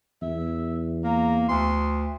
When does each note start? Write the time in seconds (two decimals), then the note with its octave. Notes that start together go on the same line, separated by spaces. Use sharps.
0.22 E2 E5
1.04 A#3 A#5
1.49 D2 C6